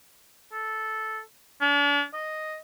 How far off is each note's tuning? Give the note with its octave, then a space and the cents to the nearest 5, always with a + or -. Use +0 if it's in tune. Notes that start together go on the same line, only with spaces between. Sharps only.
A4 -5
D4 -40
D#5 +0